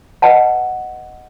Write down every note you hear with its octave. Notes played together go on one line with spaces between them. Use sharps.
B4 D#5 F#5 A5